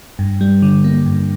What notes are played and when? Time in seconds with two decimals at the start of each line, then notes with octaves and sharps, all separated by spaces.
0.19 G2
0.41 G3
0.62 D3
0.84 A#3
1.06 G2